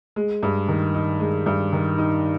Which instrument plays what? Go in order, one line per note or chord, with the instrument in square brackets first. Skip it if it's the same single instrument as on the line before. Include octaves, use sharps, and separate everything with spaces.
[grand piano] G#3
G2
D#3
D#4
G#3
G2
D#3
D#4